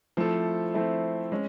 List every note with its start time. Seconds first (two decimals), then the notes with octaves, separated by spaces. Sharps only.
0.17 F3 A3 C4 E4 A4
0.74 F3 A3 C4 E4 A4
1.32 G#3 C#4